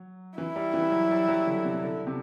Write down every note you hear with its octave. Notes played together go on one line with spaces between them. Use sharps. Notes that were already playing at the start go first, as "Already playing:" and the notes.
Already playing: F#3
E3 E4
G3
E3
F#3
G3
F#3
D3
C3
D3
C3